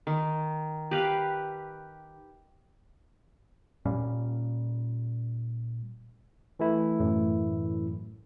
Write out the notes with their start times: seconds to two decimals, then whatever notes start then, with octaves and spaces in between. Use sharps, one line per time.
0.07 D#3
0.91 G4 B4 F5
3.86 A#2 G3 A#3 C#4
6.59 E3 A3 E4
7.00 F#2 A2